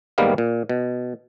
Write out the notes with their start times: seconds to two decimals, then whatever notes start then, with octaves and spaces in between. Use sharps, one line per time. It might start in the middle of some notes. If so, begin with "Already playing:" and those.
0.18 G#2 D#3 G3 A#3 B3 F5
0.38 A#2
0.69 B2